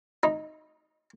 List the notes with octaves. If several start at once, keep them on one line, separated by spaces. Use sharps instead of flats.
D#4